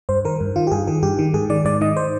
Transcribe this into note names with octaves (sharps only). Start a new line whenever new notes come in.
G2 C5
D#3 A#4
G2
D#3 F4
G4
G2 G#4
D#3 G#4
G2 G4
D#3
G#2 G#4
D#3 D5
G#2 D5
D#3 D#5
C5